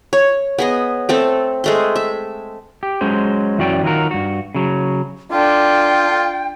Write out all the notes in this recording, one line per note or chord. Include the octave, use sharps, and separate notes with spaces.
C#5
B3 G#4 D#5
A3 C4 A4
G#3 A3 C6
E5
G4
F#3 G#3 C#4 C5
F#2 E3 C#4 F#4 D5 G5
D#3 F#3 F4 F#4 A#4
G2 F#4
C#3 F#3
D3 F4 G5